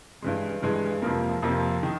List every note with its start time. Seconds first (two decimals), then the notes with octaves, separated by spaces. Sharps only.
0.22 G2 E3 G#3
0.62 G2 E3 G#3
1.02 F2 C3 F3 A#3
1.42 F2 C3 F3 A#3
1.83 D#3